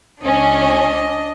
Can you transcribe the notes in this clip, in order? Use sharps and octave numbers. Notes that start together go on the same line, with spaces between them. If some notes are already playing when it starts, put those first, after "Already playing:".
C#2 C#4 D4 D#5 G#5